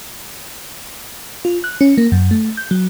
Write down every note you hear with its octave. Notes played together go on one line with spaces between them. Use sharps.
F4
F#6
C#4
A#3
F#2
A3
G6
F#3